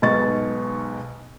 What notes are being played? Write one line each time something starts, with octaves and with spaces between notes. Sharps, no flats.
B1 G#2 B2 C#6 A6